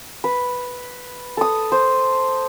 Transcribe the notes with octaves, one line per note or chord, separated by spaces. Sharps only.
B4
A4 D#6
C5